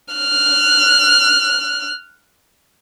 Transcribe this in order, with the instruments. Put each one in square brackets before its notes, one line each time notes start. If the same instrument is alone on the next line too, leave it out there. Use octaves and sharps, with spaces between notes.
[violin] F6 F#6